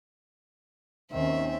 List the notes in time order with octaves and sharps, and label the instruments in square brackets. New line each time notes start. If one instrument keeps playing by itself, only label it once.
[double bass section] D#2 D#3 C#4 [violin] C4 E5